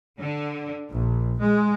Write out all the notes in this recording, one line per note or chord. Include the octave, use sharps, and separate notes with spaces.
D3
A#1
G#3